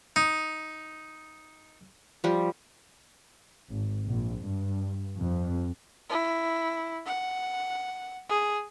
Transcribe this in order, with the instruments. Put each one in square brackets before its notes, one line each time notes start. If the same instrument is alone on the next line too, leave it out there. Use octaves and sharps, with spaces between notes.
[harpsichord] D#4
[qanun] F3 G3
[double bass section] G#1
A#1
G2
F2
[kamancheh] E4
F#5
G#4